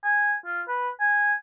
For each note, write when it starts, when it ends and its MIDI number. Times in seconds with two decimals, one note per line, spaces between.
0.04 0.34 80
0.46 0.62 65
0.68 0.90 71
1.00 1.34 80